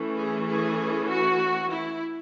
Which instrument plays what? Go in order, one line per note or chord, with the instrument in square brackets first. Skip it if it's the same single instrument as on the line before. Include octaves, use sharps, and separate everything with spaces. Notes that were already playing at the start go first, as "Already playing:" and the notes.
Already playing: [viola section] E3 A3 C#4
G#4
G#4
F#4
E4